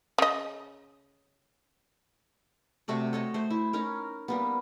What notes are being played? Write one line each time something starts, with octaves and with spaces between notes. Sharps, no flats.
C#3 D#5
C3 A3 F#4 D5
A4 C#5 D#5
A3 C5
E4
C#4 D#4 A#4
G3 A#3 B3